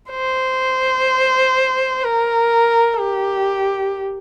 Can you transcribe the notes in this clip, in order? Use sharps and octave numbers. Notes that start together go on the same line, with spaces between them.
C5
A#4
G4